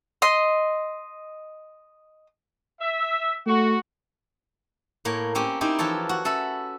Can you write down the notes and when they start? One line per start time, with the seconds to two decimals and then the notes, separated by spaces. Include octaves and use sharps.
0.22 D#5 C6
2.81 E5
3.46 A3 F#4
5.05 A2 A#3 C#5
5.35 A#3 C4 C#4 G4
5.61 C4 D#4 E4 G4 C5
5.79 E3 F3 F4 A4 C#5
6.09 F#4
6.25 C#4 A4 E5 B5